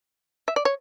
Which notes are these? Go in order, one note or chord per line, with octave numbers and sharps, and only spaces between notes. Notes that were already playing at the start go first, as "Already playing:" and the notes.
E5
D5
C#5